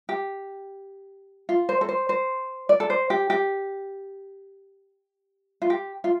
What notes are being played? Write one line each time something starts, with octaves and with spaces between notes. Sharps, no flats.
G4
F4
C5
A4
C5
C5
D5
A4
C5
G4
G4
F4
G4
F4